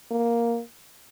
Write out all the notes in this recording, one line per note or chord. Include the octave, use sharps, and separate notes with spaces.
A#3